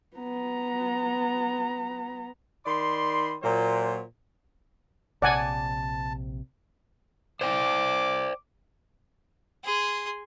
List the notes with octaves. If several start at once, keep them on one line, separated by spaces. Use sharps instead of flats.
B3 A#5
D#3 D5 B5 C6
A#2 F#3 C5
A#1 C3 D5 F#5 G#5 A5
C5 D5 G5 D6
G#4 C6